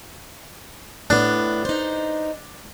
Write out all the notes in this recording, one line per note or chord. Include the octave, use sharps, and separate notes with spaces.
A2 B3 D4
D#4 C5